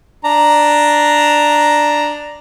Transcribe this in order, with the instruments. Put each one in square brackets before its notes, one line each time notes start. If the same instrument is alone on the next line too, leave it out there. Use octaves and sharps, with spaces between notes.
[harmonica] D4 A#5